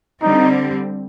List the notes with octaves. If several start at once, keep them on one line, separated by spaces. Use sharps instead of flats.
D3 G3 C4 D#4